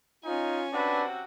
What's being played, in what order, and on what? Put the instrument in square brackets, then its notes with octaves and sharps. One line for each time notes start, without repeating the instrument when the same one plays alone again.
[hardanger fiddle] C#4 G#5 [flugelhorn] D#4 [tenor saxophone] F4
[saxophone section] C3 C4 F#4 [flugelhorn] D4 [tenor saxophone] B4